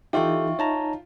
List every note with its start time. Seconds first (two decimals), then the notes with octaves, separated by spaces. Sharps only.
0.13 E3 D#4 F4 G4 A4 E5 G5 C#6
0.59 D#4 C#5 A5 A#5